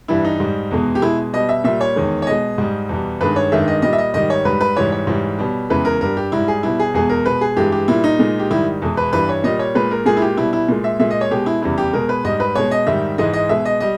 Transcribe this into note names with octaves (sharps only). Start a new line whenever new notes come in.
G2 E3 G3 E4
D#4
G#2 G3
E2 B2 G#3
G4
B2 G#3 E4
B2 G3 D#5
E5
A#2 G3 E5
C#5
E2 D#3 G#3
C#5
B2 G#3 D#5
G#2 G3
E2 B2 G3
G2 D#3 G#3 B4
C#5
G2 D#3 G#3 E5
D#5
A#2 G3 D#5
E5
D#5
G#2 D#3 G3 D#5
C#5
G#2 G3 B4
B4
G#2 E3 G3 C#5
C#5
G#2 E3 G3
B2 G3
E2 C#3 E3 G#3 B4
A#4
G2 G3 A#4
G4
G#2 G3 E4
G#4
B2 G3 E4
G#4
E2 B2 G#3 G#4
A#4
B2 G#3 B4
G#4
G2 E3 G#3 G4
G4
A#2 G3 E4
D#4
A#2 G#3
G4
G#2 D#3 G3 E4
E2 B2 G#3
B4
G2 E3 G3 B4
C#5
A#2 G3 D#5
C#5
A#2 G#3 B4
A#4
A#2 G#3 G#4
E4
G4
B2 G3 E4
E4
A#2 G#3
E5
A#2 G#3 E5
D#5
C#5
B2 G#3 G4
E4
E2 C#3 G3 E4
G4
B2 G#3 A#4
B4
G#2 G3 D#5
B4
B2 G#3 C#5
D#5
G#2 D#3 G3 E5
G#2 E3 G#3 D#5
D#5
B2 G#3 E5
D#5
G3 D#5